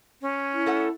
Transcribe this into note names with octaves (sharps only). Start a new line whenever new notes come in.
C#4
E4
A3 A4 F#5